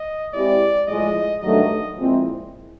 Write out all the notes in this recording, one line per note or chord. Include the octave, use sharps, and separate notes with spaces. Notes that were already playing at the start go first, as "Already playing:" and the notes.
Already playing: D#5
G#3 C4 E4 G4 D5
A2 F3 G#3 D#5
G2 D#3 F#3 A3 D4 D#5
A#2 F3 G#3 C4 E4